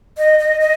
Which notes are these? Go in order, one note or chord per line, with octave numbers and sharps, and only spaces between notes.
D#5
D#5
D#5